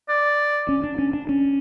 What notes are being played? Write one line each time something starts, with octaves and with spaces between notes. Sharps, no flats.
D5
C#4
D4
C#4
D4
C#4